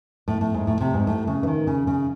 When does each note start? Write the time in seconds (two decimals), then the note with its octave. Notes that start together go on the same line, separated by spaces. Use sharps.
0.28 A2
0.41 A2
0.54 G#2
0.67 A2
0.81 C3
0.94 G#2
1.07 A2
1.27 C#3
1.43 E3
1.47 D#3
1.67 C#3
1.87 C#3